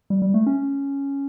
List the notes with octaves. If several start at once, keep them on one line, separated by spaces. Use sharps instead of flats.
G3
G3
A3
C#4